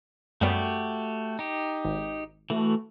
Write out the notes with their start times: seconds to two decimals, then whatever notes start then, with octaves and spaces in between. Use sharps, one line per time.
0.41 F#2 G3 A3 B3 F#4 G4
1.39 D#4 G4
1.85 G#1
2.50 E3 A3 F#4